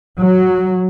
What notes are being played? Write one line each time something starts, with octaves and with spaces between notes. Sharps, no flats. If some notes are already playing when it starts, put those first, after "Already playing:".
F#3